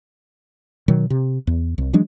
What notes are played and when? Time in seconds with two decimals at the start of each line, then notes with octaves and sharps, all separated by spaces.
0.88 B2 D#3 F#3
1.10 C3
1.47 E2
1.78 C2
1.93 E3 F#3 G#3 D4